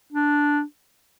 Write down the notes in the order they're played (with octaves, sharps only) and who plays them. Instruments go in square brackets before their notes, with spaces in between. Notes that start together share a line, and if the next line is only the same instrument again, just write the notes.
[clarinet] D4